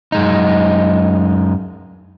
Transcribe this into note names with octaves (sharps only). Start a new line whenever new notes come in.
F#2 G#3 D#4